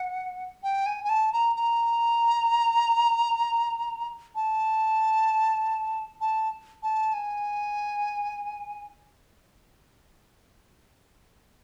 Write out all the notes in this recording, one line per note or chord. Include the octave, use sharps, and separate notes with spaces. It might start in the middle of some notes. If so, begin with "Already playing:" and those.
Already playing: F#5
G5
G#5
G#5
A5
A#5
A#5
A5
A5
A5
G#5